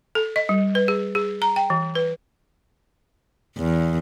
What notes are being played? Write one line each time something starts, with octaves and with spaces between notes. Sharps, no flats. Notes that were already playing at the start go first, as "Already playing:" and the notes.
A4
D#5
G3
B4
G#4
G#4
A#5
G5
E3
B4
E2